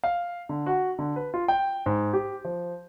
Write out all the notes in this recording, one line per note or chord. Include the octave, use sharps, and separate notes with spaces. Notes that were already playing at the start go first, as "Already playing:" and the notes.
F5
D3
F#4
D3
B4
F4
G5
G#2
G4
F3